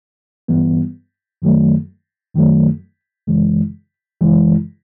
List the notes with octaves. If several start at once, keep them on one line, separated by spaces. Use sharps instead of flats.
G2 E3 G3 B3
F#2 D#3 F#3 A3
F#2 D#3 F#3 A3
F#2 C#3 E3 G#3
F#2 C#3 E3 G#3